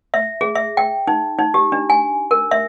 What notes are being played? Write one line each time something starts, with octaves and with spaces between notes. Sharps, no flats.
E5
G#4
E5
G5
D#4
D#4
G4
D4
G#5
A#4
E5